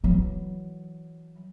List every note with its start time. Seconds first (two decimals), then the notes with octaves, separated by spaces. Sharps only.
0.04 E3 F#3